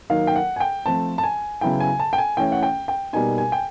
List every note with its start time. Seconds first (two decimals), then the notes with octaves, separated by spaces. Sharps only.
0.10 D#3 F#3 A#3 D#4 F5
0.27 G5
0.36 F#5
0.56 G#5
0.60 G5
0.86 F3 A3 C4 A5
1.18 A5
1.24 G#5
1.61 C#3 F#3 B3 E4 G5
1.80 G#5
2.00 A5
2.13 G5
2.18 G#5
2.37 E3 A3 C#4 E4 G5
2.52 F#5
2.63 G5
2.88 G5
3.13 B2 G3 A#3 D#4 G#5
3.38 G#5
3.52 G5